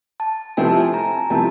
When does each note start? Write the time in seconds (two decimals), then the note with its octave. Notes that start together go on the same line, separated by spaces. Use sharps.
0.20 A5
0.57 C3 F3 A3 C4 E4 G#5
0.69 A5
0.80 G#5
0.94 A#5
1.30 C3 F3 A3 C4 E4 A5